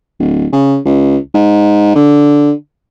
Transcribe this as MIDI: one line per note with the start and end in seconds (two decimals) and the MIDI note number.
0.19 0.46 26
0.53 0.78 49
0.85 1.17 37
1.35 1.95 44
1.96 2.52 50